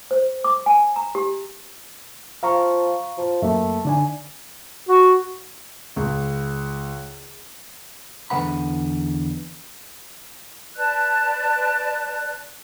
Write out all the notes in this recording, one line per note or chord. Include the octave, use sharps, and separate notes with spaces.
C5
D6
G#5
A#5
G4
F3 F5 A#5 C#6
F3
F#2 A3 A#3
D3 D4 G#5
F#4
C#2
E2 D3 F#3 B4 F#5 B5
B4 D5 A5 F#6